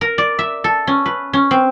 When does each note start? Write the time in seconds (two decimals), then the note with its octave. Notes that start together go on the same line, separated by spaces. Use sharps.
0.01 A#4
0.18 D5
0.39 E5
0.64 A4
0.87 C#4
1.06 B4
1.33 C#4
1.51 C4